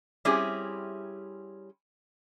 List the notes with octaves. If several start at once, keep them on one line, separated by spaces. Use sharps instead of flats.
G3 C4 C#4 E4 G4 G#4